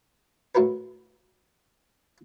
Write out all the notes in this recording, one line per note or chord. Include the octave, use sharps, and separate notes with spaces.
A2 E4 F#4 A#4 B4